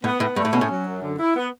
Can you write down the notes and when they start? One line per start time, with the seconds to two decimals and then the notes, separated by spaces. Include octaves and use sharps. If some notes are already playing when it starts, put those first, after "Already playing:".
0.04 A2 B3
0.20 A2 B3
0.36 G2 A3
0.45 A2
0.53 B2 C#4
0.61 A2
0.70 F#3
0.86 F#2
1.03 D3
1.19 E4
1.36 B3